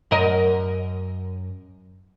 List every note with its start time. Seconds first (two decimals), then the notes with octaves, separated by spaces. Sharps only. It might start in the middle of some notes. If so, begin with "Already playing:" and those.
0.11 F#2 A#4 D#5